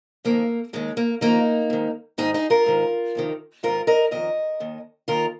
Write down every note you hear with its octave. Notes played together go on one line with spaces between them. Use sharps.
F2 D#3 A#3
D#2 D#3 G#3
A#3
F2 D#3 A#3 D#4
G#2 D#3
G#2 D#3 D#4 G#4
D#4 G#4
F4 A#4
G#2 D#3
F2 C3 D#3
G#2 D#3 F4 A#4
A#4 D#5
F2 C3 D#3 A#4 D#5
D#2 D#3
D#2 D#3 F4 A#4